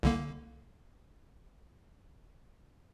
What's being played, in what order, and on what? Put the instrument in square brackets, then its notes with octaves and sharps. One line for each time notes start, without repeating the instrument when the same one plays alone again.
[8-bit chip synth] C2 D3 A#3